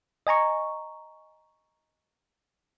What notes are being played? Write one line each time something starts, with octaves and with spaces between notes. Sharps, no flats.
D#5 G#5 A#5 C#6